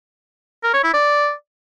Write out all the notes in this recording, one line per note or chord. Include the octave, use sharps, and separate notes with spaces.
A#4
C#5
E4
D5